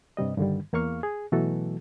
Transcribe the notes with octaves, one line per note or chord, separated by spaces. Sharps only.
G2 C3 G3 D#5
G2 D3 D#3 G3
E2 A#3 F5 C#6 F6
G#4
B2 E3 F#3 A3 F#4 A4